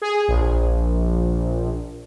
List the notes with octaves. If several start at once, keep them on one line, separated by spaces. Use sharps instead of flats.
G#4
A#1